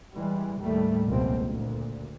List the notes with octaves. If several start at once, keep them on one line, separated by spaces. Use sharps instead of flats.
E3 G3 G#3
D#2 A2 G3 A3
F1 C#2 B2 A#3 C4
D2 A#2